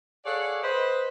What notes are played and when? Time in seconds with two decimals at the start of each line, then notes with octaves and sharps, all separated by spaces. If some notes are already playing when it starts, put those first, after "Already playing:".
0.25 G#4 A4 C#5 D5 F5 F#5
0.63 B4 C5 D#5